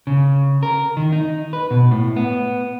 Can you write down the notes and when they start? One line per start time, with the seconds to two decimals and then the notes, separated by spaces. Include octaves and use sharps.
0.07 C#3
0.63 A#4
0.97 D#3
1.13 D#4
1.53 B4
1.71 B2
1.91 A2
2.16 B3